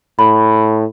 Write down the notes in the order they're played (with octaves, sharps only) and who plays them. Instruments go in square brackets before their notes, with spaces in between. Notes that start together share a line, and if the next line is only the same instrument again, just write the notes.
[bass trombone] A2 [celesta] B5